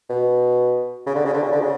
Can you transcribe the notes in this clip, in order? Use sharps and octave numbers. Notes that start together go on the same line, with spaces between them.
B2
C#3
D3
C#3
D3
C#3
D3
C#3